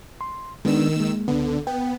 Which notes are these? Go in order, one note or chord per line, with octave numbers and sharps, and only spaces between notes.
C6
D#3 G#3 B3 D4 E6
G#3 A#3
C#2 D3 B3
B3 G5